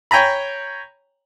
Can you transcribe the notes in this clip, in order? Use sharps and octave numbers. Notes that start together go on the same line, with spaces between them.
C#5 G5 G#5 A#5 B5